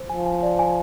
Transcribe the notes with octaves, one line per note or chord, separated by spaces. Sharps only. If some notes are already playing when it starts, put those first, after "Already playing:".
Already playing: C5
F3 G#5
G#5
D5
G#5